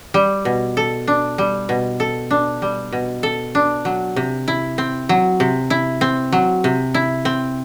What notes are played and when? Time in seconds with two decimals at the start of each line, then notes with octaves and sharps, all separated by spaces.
0.14 G3
0.45 B2
0.77 A4
1.07 D4
1.38 G3
1.69 B2
2.00 A4
2.30 D4
2.62 G3
2.92 B2
3.23 A4
3.55 D4
3.85 F#3
4.16 C3
4.48 E4
4.78 C4
5.09 F#3
5.40 C3
5.70 E4
6.01 C4
6.32 F#3
6.64 C3
6.94 E4
7.25 C4